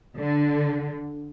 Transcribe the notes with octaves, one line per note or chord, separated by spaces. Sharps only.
D3